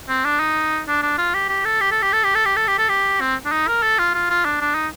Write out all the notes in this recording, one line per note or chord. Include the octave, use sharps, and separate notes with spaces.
C4
D4
D#4
D4
D4
F4
G4
G4
A4
G4
A4
G4
A4
G4
A4
G4
A4
G4
A4
G4
C4
D4
D#4
A#4
A4
F4
F4
F4
D4
D4
D#4